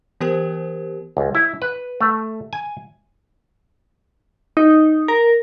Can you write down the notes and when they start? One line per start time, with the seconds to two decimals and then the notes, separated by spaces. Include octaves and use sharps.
0.21 E3 B3 G4 A#4 C5
1.17 C#2
1.35 E4
1.62 B4
2.01 A3
2.53 G#5
4.57 D#4
5.08 A#4